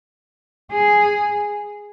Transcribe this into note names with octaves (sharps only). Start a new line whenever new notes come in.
G#4